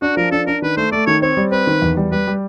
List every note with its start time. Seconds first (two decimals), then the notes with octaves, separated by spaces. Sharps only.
0.02 D4 F#4
0.17 F3 A#4
0.32 D4 A4
0.47 D4 A#4
0.62 D#3 B4
0.77 A3 C5
0.92 A3 D5
1.07 D#3 C#5
1.22 C4 C#5
1.37 G3
1.52 C4 B4
1.67 D#3
1.82 E2
1.97 G3
2.12 G3 B4
2.27 G3